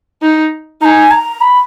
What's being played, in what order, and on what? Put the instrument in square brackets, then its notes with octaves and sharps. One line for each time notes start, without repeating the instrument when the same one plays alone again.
[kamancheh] D#4
[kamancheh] D#4 [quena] G#5 A#5
[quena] A#5
B5